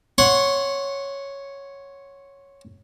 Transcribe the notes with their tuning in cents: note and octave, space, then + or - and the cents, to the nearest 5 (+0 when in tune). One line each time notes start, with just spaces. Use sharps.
C#5 +0 F#5 -5 C6 +20